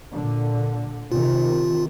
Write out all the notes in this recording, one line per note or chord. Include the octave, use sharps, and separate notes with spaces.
A#2 D3
C3 D#3 F4